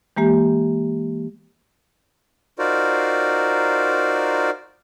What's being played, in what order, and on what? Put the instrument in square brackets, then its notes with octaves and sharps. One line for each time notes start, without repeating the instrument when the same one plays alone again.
[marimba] E3 G#3 A#3 G4
[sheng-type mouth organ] D#4 F4 F#4 A#4 C5 D5